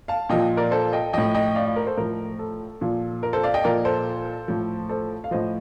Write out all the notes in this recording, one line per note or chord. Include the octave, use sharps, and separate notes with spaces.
F5 A5
A#2 F3 D#5 G5
A#4 D5
A4 C5
D#5 G5
A2 F3 D#5 G5
D#5 G5
D5 F5
D5 F5
A#4
A4 C5
A2 F3 A#4
A4
A#2 F3
A#4
A4 C5
D5 F5
D#5 G5
A#2 F3 A#4 D5
A4 C5
A2 F3
A4 C5
F5
A2 F3 C5 D#5